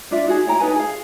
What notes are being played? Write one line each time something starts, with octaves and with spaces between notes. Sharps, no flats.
D4 F4 D5 E5
D#4 F#4 G#4
E4 C#5 G5 A#5
D#4 A4 B4 G#5
G#4 F5